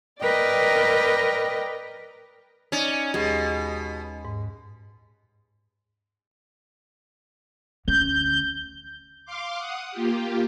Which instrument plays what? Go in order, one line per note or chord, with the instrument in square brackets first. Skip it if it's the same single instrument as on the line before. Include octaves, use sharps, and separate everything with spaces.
[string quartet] A#4 B4 D5 D#5 G5
[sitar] C#4 [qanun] D#4 D5
[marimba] D#2 G4 G#6 [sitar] B2 [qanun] G#3
[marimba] G#2
[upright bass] D2 C#4 [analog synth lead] G6
[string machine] F5 C6 D6
F#5 D#6
A#3 F4 G4